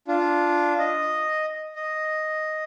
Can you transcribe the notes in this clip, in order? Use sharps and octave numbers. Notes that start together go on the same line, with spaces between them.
D4 F4
D#5
D#5